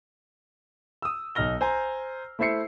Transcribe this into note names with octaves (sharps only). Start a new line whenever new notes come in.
D#6 E6
B1 D#4 F6 A#6 G7
C5 G#5 A#5
A3 E4 C5 E5 C7 C#7